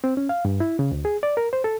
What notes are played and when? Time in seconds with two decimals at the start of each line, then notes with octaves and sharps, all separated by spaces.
0.04 C4
0.17 C#4
0.29 F5
0.45 G2
0.60 E4
0.79 C#3
0.91 D2
1.05 G#4
1.23 D5
1.37 A#4
1.53 C5
1.64 A4